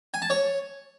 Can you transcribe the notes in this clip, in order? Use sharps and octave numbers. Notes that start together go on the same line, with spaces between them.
G#5
A5
C#5